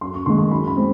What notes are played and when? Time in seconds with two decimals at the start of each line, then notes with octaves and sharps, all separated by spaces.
0.01 F#2 C6
0.14 C#6
0.26 D#3 G#3 C6
0.38 C6
0.51 F#2 B5
0.68 B5
0.77 G#3 C4